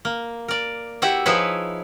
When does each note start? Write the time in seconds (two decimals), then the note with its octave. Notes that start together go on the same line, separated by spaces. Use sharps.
0.05 A#3
0.48 A#4 D5
1.02 E4 F#4 G4 E5 F#5
1.26 F3 D#4 E4 G#4 B4 C#5